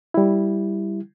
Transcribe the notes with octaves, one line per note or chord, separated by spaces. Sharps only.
G3 E4